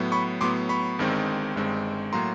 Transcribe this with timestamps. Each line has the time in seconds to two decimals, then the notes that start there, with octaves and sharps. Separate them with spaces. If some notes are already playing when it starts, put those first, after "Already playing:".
Already playing: A2 F#3 B3
0.12 B5 C#6
0.41 A2 F#3 B3 C6 D6
0.69 B5 C#6
0.99 G1 G2 D#3 G#3 C4
1.56 G1 G2 D#3 G#3 C4
2.13 A2 F#3 A#3 A#5 C6